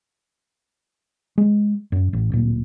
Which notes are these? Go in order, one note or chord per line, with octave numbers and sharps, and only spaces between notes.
G#3
F#2
A1
D1 A#2